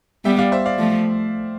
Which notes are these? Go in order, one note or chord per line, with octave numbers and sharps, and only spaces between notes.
G3 B3 E5 G5
D5 F5
C5 E5
D5 F5
F3 A3